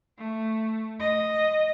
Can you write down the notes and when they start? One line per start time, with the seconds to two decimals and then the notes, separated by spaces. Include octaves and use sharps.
0.18 A3
1.00 D#5